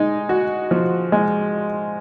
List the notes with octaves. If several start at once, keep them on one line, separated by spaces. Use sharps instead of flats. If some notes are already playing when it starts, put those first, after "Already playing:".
Already playing: G#3 D#4
F#4
F3
G#3